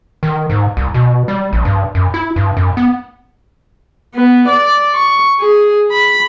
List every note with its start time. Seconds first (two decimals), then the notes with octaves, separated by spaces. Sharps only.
0.23 D#3
0.50 G#2
0.77 C2
0.94 B2
1.28 G3
1.53 A#1
1.65 G2
1.95 F#2
2.14 E4
2.36 G2
2.57 F#2
2.77 B3
4.14 B3
4.47 D5
4.94 C#6
5.40 G#4
5.92 B5